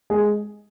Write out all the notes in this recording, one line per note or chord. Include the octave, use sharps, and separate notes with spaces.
G#3 G#4